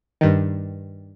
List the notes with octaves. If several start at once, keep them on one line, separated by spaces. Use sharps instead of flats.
G2 D#3